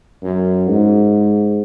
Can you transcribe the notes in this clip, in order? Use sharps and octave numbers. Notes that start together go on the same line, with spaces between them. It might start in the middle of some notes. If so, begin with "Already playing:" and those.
F#2
G#2